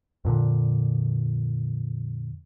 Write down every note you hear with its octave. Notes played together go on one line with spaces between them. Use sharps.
F2 A#2 D3